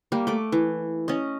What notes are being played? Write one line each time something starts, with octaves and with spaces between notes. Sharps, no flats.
G3 A#3
A3 D6
E3
C#4 D#5